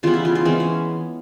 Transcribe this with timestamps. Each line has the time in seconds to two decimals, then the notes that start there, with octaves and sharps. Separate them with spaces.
0.03 C#3 E3 G3 B3 F4
0.14 E4
0.25 F4
0.35 F4
0.45 E3 G#3 B3 C4
0.60 C#4